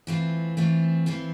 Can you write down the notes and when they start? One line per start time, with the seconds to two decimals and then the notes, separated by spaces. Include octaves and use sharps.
0.07 E3 A3 C4 F4
0.57 E3 A3 C4 F4
1.06 E3 A3 C4 F4